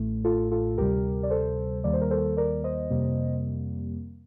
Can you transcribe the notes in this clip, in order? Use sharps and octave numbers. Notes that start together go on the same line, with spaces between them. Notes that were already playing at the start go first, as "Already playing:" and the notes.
Already playing: A1 A2 A3
F4 A4
F4 A4
D2 C3 G3 G4 A#4
D5
A4 C5
D#2 D#3 G3 A#3 D5
C5
A#4
A4 C5
A#4 D5
C5 D#5
F2 C3 G3 A#3